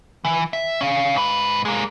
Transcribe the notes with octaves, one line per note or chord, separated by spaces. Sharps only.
E3
E5
C#4 F5
G#2 B4
G#3 A#3